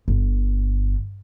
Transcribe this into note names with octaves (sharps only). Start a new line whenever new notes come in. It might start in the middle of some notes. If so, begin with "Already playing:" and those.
G1